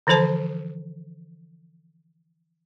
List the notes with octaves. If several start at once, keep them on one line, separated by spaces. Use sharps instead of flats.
D3 E3 F3 A4 C5 A5